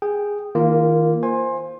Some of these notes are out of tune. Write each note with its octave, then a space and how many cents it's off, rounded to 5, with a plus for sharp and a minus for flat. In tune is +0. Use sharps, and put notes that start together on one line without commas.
G#4 -10 G5 +0
D#3 +30 A#3 +0 F4 -20
C5 +0 G#5 -10 C6 +25